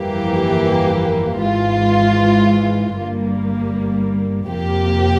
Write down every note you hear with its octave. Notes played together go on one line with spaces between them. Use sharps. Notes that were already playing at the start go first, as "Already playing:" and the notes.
Already playing: G1 F2 E3 G3 A#3 G4
G#1 G#2 E3 G#3 F4
G1 G2 G3 A#3
F2 C3 F3 A#3 G4